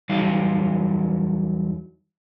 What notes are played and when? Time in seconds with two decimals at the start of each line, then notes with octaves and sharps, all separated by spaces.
0.09 E2 F#3 G3 D#4 F5